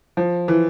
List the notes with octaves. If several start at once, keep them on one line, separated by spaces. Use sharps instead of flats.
F3
E3